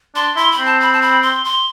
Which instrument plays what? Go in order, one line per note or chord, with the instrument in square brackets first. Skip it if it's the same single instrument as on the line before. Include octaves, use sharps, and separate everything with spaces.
[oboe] D4 [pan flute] C6
[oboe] E4 [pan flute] C6
[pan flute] B5
[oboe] C4
[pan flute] A5
B5
A5
B5
C6
C6